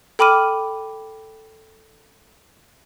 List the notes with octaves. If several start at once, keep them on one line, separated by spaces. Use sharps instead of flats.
A4 G5 B5 D6 F6 D#7